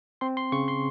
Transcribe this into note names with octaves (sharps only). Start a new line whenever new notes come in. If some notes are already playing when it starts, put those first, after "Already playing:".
C4 C6
C6
C#3 C#6
C6